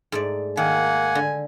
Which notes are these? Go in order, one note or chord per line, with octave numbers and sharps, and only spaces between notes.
G#2 A3 D5
D#3 A#3 F#5 G#5
D3